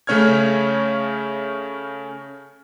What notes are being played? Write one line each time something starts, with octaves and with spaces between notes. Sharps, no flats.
C#3 A3 C#4 C#5 F6 G#6